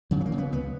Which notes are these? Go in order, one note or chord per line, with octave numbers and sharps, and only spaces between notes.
C#3 F#3
B3
A#3
C#3
B3
C#2 B3